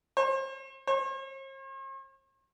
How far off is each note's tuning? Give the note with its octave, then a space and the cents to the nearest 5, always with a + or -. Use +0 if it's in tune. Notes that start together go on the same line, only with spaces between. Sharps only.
C5 +35
C5 +45